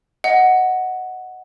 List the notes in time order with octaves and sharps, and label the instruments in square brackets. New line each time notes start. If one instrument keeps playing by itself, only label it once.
[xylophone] D#5 F#5